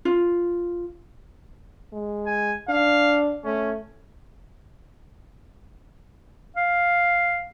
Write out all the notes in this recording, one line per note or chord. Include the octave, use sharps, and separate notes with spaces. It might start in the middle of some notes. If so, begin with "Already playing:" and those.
F4
G#3
G#5
D4 F5
A3 C#4
F5